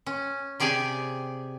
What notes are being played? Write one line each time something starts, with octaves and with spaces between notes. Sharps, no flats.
C#4
C3 G4 G#4 D5 G#5